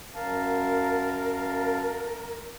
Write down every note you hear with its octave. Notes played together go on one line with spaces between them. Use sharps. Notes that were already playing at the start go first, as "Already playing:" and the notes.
F#2 A#4 F5 A5